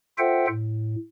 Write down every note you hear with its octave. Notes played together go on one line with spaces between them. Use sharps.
F4 A4 C5 E5 F#5 G5
A2